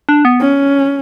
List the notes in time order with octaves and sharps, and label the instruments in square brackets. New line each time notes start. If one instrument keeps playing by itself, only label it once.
[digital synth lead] D4
B3
[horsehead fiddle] C#4